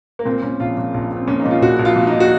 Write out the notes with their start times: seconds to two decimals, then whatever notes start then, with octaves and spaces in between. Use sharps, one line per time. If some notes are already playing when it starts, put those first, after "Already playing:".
0.19 A#3
0.25 A#2 C4
0.42 A#2 C#4
0.60 A#1 F4
0.77 A#2
0.94 A#1
1.11 A#1
1.16 C4
1.28 A#2 C#4
1.40 D#4
1.46 A#2
1.51 F4
1.62 A#1 F#4
1.79 A#1
1.85 F4
1.96 A#2
2.07 D#4
2.13 A#2
2.20 F#4